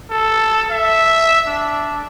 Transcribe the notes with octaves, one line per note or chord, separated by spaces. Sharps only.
A4
E5
D4